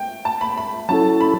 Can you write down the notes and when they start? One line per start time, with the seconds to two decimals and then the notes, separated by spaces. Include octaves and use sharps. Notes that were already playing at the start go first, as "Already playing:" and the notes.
Already playing: G5
0.25 A5
0.41 B5
0.57 B5
0.89 F#3 C#4 E4 A4 A5
1.21 B5